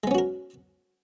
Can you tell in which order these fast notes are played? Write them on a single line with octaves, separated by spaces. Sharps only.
G#3 B3 C#4 F#4 A#4